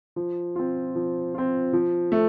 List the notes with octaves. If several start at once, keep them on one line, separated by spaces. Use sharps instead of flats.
F3
C4 F4
F3
C4 F4
F3
A3